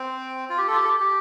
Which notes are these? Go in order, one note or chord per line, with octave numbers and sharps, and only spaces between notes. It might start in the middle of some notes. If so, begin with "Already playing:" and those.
Already playing: C4
F4
G4
F4 A4
G4
A4
G4
G4